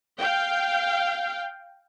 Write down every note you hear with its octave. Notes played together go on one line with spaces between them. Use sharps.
F5 G5